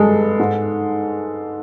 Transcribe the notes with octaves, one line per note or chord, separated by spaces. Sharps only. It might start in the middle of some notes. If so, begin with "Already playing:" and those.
Already playing: G2 G#3 A4
G#2